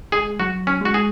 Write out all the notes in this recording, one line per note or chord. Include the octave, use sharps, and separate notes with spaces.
G#3 G#4
F#3 F#4
C#4
G#3 F#4
G#4